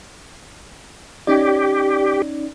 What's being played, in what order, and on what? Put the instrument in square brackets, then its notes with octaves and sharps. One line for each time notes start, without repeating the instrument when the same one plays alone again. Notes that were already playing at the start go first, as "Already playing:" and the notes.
[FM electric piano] C#4 D#4 D5 [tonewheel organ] G4